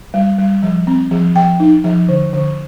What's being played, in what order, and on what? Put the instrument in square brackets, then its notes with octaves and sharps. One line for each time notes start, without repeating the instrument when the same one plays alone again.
[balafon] G3
G3
F3
C4
F3
F3 G5
D#4
F3
D3
D3